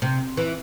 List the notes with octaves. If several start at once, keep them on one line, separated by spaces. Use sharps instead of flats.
C3
E3